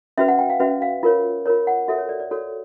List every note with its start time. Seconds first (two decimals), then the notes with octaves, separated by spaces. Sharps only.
0.18 C#4 F#4 B4 E5
0.28 F#5
0.39 G5
0.50 F5
0.60 C#4 F#4 B4 E5
0.82 F5
1.03 F4 A#4 C#5
1.46 F4 A#4 C#5
1.67 F#5
1.88 F#4 A4 C#5 E5
1.98 C#5
2.09 D5
2.20 D5
2.31 F#4 A4 C#5